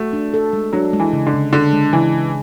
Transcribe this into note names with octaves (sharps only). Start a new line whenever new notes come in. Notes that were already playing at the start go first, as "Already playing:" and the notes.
Already playing: A3 F#4
D4
A4
G#3
F#3 D4
G#3
E3
C#3
D3
C#3
D3 D4
G#3
C#3 E3
C#3